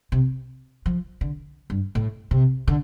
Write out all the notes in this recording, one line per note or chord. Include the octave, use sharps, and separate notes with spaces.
C3
F3
D3
G2
A2
C3
D3